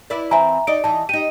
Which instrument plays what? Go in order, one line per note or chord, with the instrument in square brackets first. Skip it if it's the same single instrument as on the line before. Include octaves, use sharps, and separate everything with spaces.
[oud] E4 B4 D5
[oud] E3 C4 [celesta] E5 G#5 A#5
[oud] D#4 D5 [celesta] D7
[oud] E3 D#4 [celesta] A5
[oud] D#4 G4 [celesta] D#7